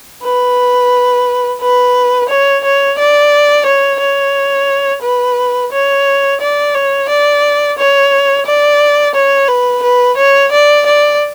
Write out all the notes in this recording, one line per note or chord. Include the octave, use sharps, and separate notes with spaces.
B4
B4
C#5
C#5
D5
C#5
C#5
B4
C#5
D5
C#5
D5
C#5
D5
C#5
B4
B4
C#5
D5
D5